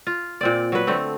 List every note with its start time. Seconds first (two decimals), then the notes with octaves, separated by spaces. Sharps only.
0.07 F4
0.41 A#2 C4 D5
0.72 F#3 B4
0.87 D3 A3 C4